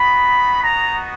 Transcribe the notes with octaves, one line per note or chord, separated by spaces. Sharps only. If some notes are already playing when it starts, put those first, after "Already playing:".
Already playing: B3 D#4 F#4 B5
A#5